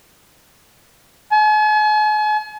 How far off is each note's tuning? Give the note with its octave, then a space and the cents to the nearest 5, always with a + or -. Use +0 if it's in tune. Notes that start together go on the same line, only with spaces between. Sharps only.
G#5 +45